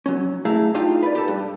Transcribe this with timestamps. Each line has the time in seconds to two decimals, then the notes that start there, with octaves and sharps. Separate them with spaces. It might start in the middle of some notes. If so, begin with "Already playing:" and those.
0.06 F#3 C#4
0.45 A3 E4 G#4 F5 A#5
0.74 D4 D#4 F4 G4 F5
1.03 B4 D5
1.15 G4 A4
1.28 G2